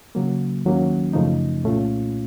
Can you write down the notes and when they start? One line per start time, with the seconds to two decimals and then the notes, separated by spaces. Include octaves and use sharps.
0.15 C#3 F#3 A#3
0.65 D#2 D#3 F#3 A#3 C#4
1.13 F#2 C#3 F3 A3 D#4
1.63 C2 A#2 A3 C#4 F4